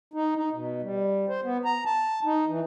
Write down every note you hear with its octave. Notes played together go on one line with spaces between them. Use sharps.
D#4
D#4
B2
G3
C5
B3
A#5
A5
D#4
E3